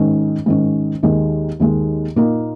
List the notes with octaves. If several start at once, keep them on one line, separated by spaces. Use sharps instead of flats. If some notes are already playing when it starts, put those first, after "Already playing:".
Already playing: G#2 D#3 C#4
G#2 D#3 C#4
D#2 D#3 G#3
D#2 D#3 G#3
A#2 A#3 D#4